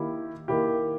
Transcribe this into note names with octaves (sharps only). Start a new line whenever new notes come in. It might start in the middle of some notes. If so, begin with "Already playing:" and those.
Already playing: D#3 A#3 E4 G4
D#3 A#3 E4 G4